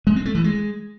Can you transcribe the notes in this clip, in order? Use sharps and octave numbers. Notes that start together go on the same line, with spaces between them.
G#3
C4
A3
E3
G#3